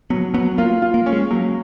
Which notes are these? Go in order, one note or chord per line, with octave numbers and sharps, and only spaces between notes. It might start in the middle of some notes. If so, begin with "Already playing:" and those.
F#3 B3
F#3 B3
A#3 F4
F4
A#3
C#4
G#3
F#3 A#3